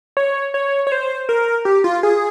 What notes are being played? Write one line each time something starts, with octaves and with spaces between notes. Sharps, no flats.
C#5
C#5
C#5
C5
A#4
G4
F4
G#4